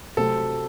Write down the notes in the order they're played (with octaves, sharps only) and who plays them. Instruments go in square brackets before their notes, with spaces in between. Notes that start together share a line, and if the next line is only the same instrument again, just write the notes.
[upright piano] C3 F#3 A3 C4 [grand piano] A4